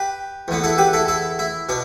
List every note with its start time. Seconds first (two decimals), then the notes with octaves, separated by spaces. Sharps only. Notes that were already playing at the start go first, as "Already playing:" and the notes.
Already playing: G4 B4
0.48 E2 D3 B3
0.64 E4 A4
0.78 G4 B4
0.93 E4 A4
1.08 E4 A4
1.39 E4
1.69 B2 D4